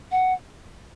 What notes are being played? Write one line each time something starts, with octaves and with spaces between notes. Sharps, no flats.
F#5